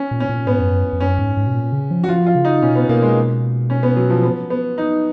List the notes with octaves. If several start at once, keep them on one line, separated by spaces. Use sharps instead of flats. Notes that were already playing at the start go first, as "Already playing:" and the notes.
Already playing: C#4
A#2
C#4
A#2
G#2 B3
F2
F#2
F2
F#2 C#4
G#2
G#2
B2
A#2
C#3
F3
F#4
F3 F4
F4
C#3
D#4
B2 C#4
B3
B2 A#3
G#3
C#4
B3
F#3
F3
B3
B3
D#4